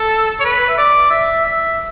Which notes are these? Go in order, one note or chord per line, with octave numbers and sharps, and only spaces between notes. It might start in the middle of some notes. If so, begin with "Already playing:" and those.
Already playing: A4
C#5
B4
E5
D5
E5
E5